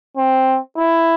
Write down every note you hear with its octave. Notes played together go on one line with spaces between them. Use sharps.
C4
E4